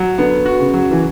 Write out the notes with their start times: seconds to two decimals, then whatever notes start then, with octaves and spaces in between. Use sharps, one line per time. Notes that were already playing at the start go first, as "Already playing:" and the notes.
Already playing: F#3
0.18 D3 B3
0.46 F#4
0.59 C#3
0.74 F#3
0.91 E3